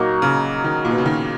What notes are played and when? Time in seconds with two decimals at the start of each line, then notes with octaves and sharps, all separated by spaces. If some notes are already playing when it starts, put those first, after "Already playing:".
Already playing: A#2 F#3 A#3 D#4 F#4
0.22 C#3
0.64 D#3
0.85 A#2
0.91 B2
0.98 C#3
1.06 D#3